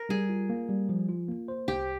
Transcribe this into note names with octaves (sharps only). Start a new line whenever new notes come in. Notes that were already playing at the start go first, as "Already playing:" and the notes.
Already playing: A#4
G3 G#4
F4
A#3
G3
F3
F4
A#3
C5
C2 G4